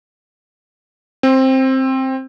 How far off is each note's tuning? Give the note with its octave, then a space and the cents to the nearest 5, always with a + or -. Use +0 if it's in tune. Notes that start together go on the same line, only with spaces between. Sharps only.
C4 +10